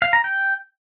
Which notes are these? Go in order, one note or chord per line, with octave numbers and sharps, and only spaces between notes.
F5
A#5
G5